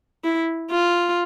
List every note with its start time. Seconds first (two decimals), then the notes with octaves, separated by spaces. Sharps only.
0.24 E4
0.71 F4